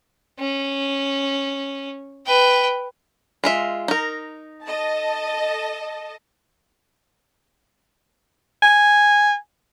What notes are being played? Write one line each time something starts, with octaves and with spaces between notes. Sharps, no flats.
C#4
B4 G5
G#3 F4 E5
D#4 A#4
A4 D#5 A5
G#5